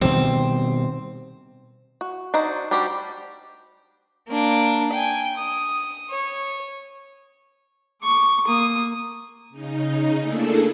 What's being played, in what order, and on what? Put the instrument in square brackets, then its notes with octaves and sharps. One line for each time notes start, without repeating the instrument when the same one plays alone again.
[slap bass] B2 D#3 G3 [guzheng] C4
[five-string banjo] F#4
D4 D#4 F#4 C5
G3 D4 F#4 G4 C5
[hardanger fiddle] A#3 D4
G5 G#5
D#6
C#5
[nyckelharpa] C#6 D6
A#3 D#6
[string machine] C#3 D#4
A3 A#3 D4 E4 G#4 A4